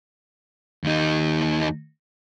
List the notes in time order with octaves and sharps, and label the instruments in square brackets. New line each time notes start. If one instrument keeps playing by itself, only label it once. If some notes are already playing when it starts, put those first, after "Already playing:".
[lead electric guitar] D#2 D#4